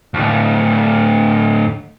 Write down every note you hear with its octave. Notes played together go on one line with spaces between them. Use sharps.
D2 A2